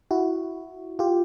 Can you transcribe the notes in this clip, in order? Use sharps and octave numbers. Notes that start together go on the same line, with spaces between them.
E4 F#4
F4 G4